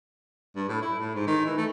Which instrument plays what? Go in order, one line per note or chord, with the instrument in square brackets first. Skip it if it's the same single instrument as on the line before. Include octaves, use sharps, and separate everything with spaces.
[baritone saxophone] G2
A2
E4
A2
G#2
D#3
E3
A3